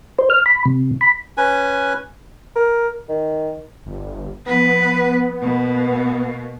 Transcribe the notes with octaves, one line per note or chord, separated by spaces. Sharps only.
C5
F6
B5
C3
B5
C#4 B4 G#5
A#4
D#3
G1
F3 B3 B4
B2 A#3